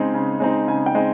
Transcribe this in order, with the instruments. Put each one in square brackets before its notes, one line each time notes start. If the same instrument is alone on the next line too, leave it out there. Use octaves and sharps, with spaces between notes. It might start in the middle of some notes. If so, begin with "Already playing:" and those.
Already playing: [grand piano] C#3 G#3 C4 D#4
C#3
G#3 C4 D#4
C#3 G#5
G5
G#3 C4 D#4